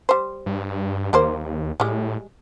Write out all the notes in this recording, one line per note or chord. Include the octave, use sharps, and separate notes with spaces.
G3 C5
G2
D#2 G3 A#3 C5
A2 G3 G#3